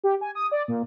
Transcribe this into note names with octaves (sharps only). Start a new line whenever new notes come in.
G4
G#5
D#6
D5
A#2